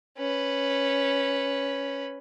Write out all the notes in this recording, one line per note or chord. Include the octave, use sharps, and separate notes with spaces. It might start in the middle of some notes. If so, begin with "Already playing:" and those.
C#4 B4